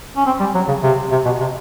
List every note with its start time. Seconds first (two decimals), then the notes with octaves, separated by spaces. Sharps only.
0.17 C#4
0.26 C4
0.40 G3
0.55 F#3
0.68 C#3
0.83 C3
1.12 C3
1.25 B2
1.40 C3